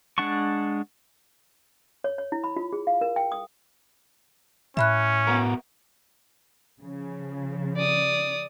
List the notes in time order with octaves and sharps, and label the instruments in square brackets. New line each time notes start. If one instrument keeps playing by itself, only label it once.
[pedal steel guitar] G#3 D4 F#5 A5 C#6
[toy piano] C#5
C#5
E4
B5
F4
G#4
F5
A#4
G5
D#6
[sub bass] A2 [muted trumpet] C#4 [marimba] E5 B5 F#6
[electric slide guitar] B3 F#4 A#4
[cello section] C#3 F3
[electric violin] D5 D#6